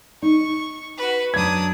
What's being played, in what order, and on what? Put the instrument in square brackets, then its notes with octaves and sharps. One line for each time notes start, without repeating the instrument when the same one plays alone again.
[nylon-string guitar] D#4 [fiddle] C#6
[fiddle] F#4 B4
[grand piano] F#2 G#6 [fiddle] D4 D#6